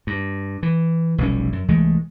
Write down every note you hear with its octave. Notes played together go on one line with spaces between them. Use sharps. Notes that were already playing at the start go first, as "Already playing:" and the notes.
G2
E3
F1 B1 G3 C#4
F#2
C2 E3 G#3 A3